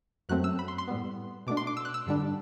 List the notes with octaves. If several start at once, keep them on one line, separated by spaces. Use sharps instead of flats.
F#2 F#3 A3 C4 F#6
E6
B5
C6
C6
A2 G3 B3
B2 A3 D4 D6
C6
D6
E6
F#6
E6
G2 D3 G3 D4